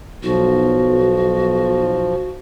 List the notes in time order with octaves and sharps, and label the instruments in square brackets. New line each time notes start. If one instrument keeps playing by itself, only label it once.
[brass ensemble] B1 [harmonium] F3 [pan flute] F#4